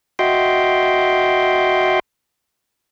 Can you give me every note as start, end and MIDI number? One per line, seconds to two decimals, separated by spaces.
0.19 2.00 66
0.19 2.00 75
0.19 2.00 76
0.19 2.00 79
0.19 2.00 84